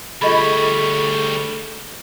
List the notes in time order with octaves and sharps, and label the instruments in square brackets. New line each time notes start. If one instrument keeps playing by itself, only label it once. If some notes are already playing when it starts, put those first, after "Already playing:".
[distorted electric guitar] D2 G3 [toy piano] F4 D#5 B5 [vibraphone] G#4 A4 C#6